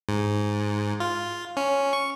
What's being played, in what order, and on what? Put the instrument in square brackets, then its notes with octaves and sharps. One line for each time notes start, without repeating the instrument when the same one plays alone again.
[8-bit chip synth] G#2
F4
C#4
C#6